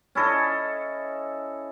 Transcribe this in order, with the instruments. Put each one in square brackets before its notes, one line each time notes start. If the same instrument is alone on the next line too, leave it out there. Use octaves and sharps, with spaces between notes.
[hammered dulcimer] C#4 E4 A4 D#5